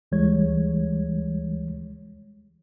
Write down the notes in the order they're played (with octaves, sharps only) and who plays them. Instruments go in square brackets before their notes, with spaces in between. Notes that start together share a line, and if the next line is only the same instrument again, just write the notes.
[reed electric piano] D2 E3 G3 G#3 C#5 G#6